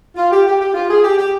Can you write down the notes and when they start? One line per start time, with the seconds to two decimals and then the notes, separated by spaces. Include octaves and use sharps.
0.17 F4
0.31 G4
0.46 G4
0.61 G4
0.74 F4
0.89 G#4
1.04 G4
1.18 G4